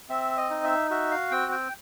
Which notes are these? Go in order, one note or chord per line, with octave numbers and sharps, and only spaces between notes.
C4 E5
D#5
D#4
E5
F#4 E5
F5
C4 G5
G5